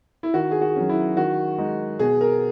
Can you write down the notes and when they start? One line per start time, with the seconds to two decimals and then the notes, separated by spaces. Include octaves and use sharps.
0.23 E4
0.34 D#3 F#4
0.51 G#4
0.61 F#4
0.76 F#3 C#4
0.89 E4
1.17 D#3 F#4
1.58 G#3 D#4
1.99 B2 G#4
2.21 A#4